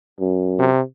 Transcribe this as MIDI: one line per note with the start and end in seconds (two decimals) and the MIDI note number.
0.21 0.68 42
0.59 0.81 48